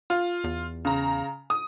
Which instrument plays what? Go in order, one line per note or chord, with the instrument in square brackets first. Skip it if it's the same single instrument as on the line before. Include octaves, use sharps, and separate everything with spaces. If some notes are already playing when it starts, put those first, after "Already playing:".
[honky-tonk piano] F4
[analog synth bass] E2
[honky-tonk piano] C#3 A#5
D#6